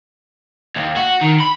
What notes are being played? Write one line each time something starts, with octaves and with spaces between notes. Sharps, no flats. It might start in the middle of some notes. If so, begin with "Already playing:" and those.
D#2
F#4
D#3
B5